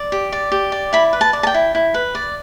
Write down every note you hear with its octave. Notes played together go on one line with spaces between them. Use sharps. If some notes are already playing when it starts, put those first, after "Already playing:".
Already playing: D5
G4
D5
G4
D5
E4 B5
B4
A5
D5
A5
G5
E4
E4
B4
D5